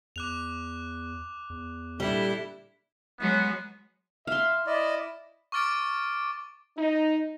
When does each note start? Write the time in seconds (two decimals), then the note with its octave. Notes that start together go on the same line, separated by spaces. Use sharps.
0.16 E2 D6 F#6 F7
1.50 E2
2.00 A#2 D3 G3 E4 B6 G7
3.20 F#3 G#3 B3
4.27 E5 F5 C6
4.67 E4 D5 D#5
5.52 C#6 D6 F6 A6 D7
6.77 D#4